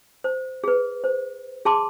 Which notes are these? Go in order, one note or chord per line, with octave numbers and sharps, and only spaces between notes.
C5
G#4 B4
C5
G#4 A5 C6 D6